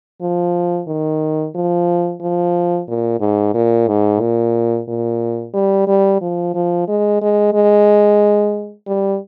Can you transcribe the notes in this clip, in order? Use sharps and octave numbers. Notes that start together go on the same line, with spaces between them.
F3
D#3
F3
F3
A#2
G#2
A#2
G#2
A#2
A#2
G3
G3
F3
F3
G#3
G#3
G#3
G3